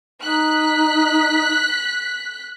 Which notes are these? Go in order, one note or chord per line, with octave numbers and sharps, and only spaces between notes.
D#4 F#6 B6